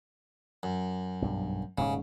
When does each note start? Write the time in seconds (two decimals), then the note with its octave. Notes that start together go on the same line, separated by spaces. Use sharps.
0.63 F#2
1.22 B1 G2
1.78 D#1 G#2 C#3 C#4